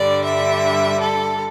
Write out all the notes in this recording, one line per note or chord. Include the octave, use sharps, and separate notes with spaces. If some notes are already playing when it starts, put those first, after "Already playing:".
Already playing: G2 D3 G3 D5
E5
A4